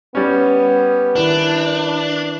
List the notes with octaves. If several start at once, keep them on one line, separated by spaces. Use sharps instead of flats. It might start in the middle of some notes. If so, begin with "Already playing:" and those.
G3 B3 C#4
D#3 D4 E4 B4